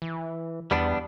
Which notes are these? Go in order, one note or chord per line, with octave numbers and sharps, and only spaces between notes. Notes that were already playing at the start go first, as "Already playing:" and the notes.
E3
E2 G3 B3 D4